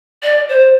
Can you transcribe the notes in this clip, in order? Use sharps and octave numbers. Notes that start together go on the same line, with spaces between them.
D5
C5